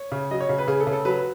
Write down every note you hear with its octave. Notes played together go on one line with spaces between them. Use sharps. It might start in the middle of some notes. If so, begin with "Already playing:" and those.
Already playing: C#5
C#3
F#3 D#5
C#5
C#3
B4
C#3 G#4
A4
C#3
A4
F#3 B4